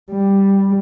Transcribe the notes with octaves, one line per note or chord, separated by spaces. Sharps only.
G3